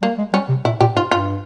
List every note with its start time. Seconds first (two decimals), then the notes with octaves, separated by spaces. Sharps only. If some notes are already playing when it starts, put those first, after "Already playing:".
0.02 G3 A#3
0.18 G#3
0.33 G3 C#4
0.49 C3
0.65 A#2 E4
0.81 A#2 G4
0.96 G#2 F4
1.11 G2 F4